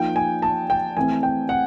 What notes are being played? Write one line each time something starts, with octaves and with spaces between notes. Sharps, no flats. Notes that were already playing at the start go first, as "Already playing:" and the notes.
Already playing: F3 A#3 D#4 G5
G#5
A5
G5
E3 A3 C4 G#5
G5
F#5